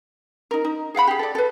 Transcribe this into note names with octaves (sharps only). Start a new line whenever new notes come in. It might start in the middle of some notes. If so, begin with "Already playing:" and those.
D#4 A#4
D#4
G#4 F5 F#5 B5
G4 G#4
A4 D5
A4 B4